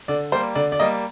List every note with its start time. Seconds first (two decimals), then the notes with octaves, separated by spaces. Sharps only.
0.08 D3 D5
0.32 G3 C5
0.35 A#3
0.55 D3 D5
0.72 D5
0.80 G3 A#3 D#5